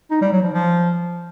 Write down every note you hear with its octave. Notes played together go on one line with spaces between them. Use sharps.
D#4
G3
F#3
F3
F3